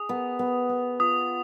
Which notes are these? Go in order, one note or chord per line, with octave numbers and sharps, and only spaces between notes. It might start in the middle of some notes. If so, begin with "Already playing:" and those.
Already playing: G#4 D#6
B3
B3
B3
F4 D#6